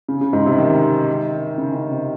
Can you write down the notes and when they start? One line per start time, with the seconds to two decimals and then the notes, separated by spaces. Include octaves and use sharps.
0.08 C#3
0.21 C#3
0.33 G#2
0.46 C3
0.58 D#3
1.58 C#3
1.74 C#3
1.91 C3